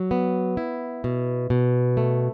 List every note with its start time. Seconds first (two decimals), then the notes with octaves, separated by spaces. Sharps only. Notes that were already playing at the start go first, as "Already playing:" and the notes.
Already playing: F#3
0.11 B3
0.57 E4
1.04 B2
1.50 B2
1.97 A3